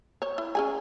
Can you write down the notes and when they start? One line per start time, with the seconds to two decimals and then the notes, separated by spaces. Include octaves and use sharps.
0.22 C5 C#5
0.38 E4
0.55 C#4 G#4 G#5